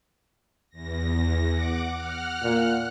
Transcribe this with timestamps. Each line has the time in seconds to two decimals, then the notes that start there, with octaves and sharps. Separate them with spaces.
0.70 E2 A#6
1.49 F#5 D6
1.93 F#5 F6 F#6
2.43 A#2